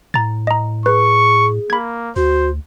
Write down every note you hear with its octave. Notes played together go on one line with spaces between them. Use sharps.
A2 A#5 A6
D#5 A#5
G#4 B4 C#6
A#3 B5 G#6
D2 F#4 C5